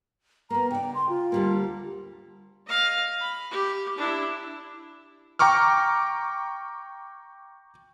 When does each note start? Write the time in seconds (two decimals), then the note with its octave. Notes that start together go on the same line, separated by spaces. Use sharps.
0.50 A#3 B3 A#5
0.71 C#3 D5 G5
0.95 C6
1.09 F4
1.32 D2 G3 A#3
2.66 D#5 F5
3.21 B5
3.51 G4
3.98 D4 E4
5.39 G5 A#5 C#6 D6 F6